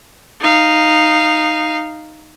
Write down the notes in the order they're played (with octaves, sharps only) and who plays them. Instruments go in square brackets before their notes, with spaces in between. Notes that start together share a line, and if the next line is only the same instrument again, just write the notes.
[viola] D#4 F5